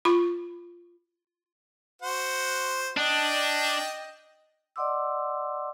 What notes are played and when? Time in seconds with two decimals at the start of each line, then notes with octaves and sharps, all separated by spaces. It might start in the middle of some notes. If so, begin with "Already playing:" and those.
0.05 F4 B5 C#6
2.02 F#4 C5 F#5
2.97 D4 D#5 G5
4.76 D5 D#5 F#5 C6 D6 E6